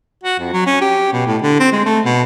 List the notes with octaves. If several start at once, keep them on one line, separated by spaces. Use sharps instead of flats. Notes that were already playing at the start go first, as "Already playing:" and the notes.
F#4
F2
F#3
C#4
G4
B2
A2
D3
C4
G#3
A3
B2